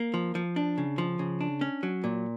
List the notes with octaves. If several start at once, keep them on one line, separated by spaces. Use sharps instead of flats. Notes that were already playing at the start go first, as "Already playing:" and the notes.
Already playing: A#3
F3
F3
D4
C#3
F3
C#3
D4
C#4
F#3
A#2